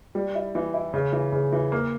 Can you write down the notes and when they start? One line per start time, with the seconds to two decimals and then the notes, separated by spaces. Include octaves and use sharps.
0.15 G3
0.35 E4
0.55 E3
0.74 E4
0.94 C#3
1.13 E3
1.32 C#3
1.52 E3
1.72 A#3